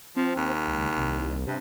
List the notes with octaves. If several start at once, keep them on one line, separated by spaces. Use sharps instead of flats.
F3 C4
D#2
C#2
C2
G2 C3